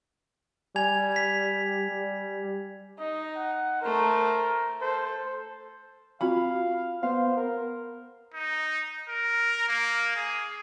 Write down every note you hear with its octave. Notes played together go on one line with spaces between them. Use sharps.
G3 G#5 G#6 F7
B6
G3
D#4 D#5
F#5
A3 A#4 C5
A4 C5
C4 F4 F#4 F5 B5
B3 C5 F5
A#4
D#4
A#4
A#3
G#4